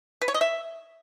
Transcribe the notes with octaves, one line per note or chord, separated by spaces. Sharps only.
B4
C#5
D#5
E5